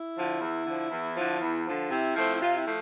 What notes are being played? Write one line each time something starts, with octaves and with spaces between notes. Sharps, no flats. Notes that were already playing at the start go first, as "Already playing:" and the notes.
Already playing: E4
D3 F3
E2
D3 F3
E2
D3 F3
E2
D3 F3
C3 E4
F3 A3 C4
E4
C3 F4
E4
F3 A3